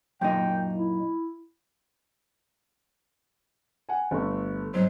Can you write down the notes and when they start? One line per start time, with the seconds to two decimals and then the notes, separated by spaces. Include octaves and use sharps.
0.21 F#2 A#2 D#4 G5
0.74 E4
3.89 F#5 G#5
4.11 G1 A3 C#6
4.74 G#2 F#3 C5